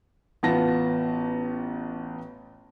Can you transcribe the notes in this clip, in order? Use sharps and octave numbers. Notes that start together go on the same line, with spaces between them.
A1 B3 F4 A5 A#6